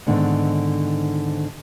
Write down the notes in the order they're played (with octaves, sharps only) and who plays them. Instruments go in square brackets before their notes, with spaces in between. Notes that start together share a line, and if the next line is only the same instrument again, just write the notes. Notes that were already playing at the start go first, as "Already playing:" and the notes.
[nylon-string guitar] G#2 D3 D#3 A3 B3 C4